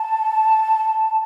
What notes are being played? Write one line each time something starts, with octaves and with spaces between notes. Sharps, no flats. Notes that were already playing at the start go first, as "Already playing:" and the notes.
Already playing: A5